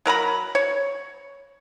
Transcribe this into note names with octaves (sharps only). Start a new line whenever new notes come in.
F#3 A#4 A#5 B5
C#5